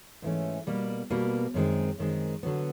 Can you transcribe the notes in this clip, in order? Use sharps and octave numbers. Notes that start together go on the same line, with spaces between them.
G#2 E3 A3 C#4
B2 G3 A#3
B2 G3 A#3
F#2 D#3 G#3 C4
F#2 D#3 G#3 C4
D3 F#3 B3